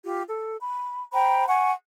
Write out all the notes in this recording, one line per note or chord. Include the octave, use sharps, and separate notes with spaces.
F4 G4
A4
B5
C5 G5 A#5 B5
F#5 G#5 C#6